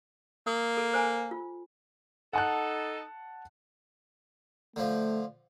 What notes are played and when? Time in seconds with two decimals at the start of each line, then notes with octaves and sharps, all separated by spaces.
0.47 A#3 D#6
0.77 A4
0.93 C5 G#5 A#5
1.31 F4
2.33 D#4 A4 F#5 A5 F#6
4.76 D3 F3 A3